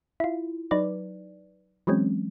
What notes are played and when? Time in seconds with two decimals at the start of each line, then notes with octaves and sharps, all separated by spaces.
0.20 E4 F4
0.71 F#3 D#4 B4 D5
1.87 E3 F#3 G#3 C4 C#4